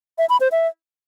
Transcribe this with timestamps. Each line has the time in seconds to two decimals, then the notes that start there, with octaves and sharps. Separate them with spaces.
0.18 E5
0.29 B5
0.41 C5
0.52 E5